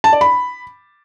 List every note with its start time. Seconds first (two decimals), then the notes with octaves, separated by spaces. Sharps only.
0.04 A5
0.13 D5
0.21 B5